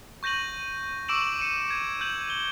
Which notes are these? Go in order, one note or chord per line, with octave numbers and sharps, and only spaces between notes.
C#6 G6 A#6 D#7 F#7
C#6 D6 E6 D7 E7 F#7
C#7 D#7 E7
G#6
G6 F#7
F#7 G7